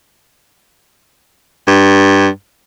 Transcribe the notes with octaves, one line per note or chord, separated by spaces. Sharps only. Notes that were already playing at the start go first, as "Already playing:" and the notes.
G2